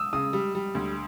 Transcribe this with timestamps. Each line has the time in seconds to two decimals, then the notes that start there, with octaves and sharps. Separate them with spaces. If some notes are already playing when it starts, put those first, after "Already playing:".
Already playing: D#6 E6
0.13 C#3 D#6
0.33 G3
0.55 G3
0.75 D2